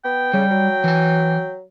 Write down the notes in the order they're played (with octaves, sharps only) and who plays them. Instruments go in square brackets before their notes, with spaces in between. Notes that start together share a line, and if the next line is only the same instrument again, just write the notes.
[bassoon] B3 [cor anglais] G5
[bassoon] C#3 [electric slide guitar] G3
[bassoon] F#3
[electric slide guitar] E3 G#5